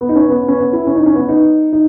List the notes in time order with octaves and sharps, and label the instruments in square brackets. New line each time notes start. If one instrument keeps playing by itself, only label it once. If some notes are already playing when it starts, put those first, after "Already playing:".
[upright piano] B3
D#4
C#4
B3
C#4
B3
E4
C#4
D#4
C#4
B3
D#4
D#4